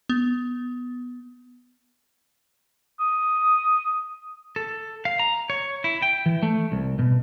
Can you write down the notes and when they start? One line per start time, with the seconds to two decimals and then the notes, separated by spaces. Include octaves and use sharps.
0.09 B3
3.00 D#6
4.56 A4
5.05 F5
5.19 A#5
5.50 C#5
5.84 E4
6.02 G5
6.26 E3
6.43 A3
6.72 C2
6.99 B2